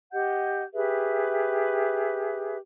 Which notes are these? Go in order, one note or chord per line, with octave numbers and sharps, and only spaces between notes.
G4 D#5 F#5 G6
G4 G#4 B4 E5